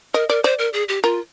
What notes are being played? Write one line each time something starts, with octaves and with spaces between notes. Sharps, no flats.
A#4 D#5
A#4 D5
C5 D5
A#4
G#4
G4
F4 A#4